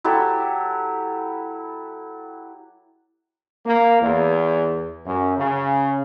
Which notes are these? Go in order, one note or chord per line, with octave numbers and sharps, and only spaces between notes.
F#3 E4 G4 A4
A#3
E2
F#2
C#3